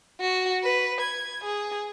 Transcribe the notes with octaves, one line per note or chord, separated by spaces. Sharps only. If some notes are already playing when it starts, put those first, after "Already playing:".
F#4
B4
G#6
G#4